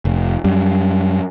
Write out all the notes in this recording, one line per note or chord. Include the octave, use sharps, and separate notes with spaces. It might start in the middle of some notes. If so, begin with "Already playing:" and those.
F1
F#2 G3